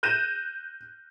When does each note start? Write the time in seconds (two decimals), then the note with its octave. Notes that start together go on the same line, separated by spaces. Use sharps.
0.03 F#6 G6 A#6 D#7 E7